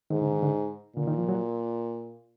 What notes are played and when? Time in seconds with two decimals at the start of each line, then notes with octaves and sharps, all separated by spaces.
0.10 G#2 D#3
0.21 D3
0.33 D#3
0.43 D3
0.96 A#2 D3
1.07 D#3
1.18 F3
1.29 F#3